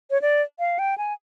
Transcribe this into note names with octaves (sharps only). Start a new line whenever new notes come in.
C#5
D5
F5
G5
G#5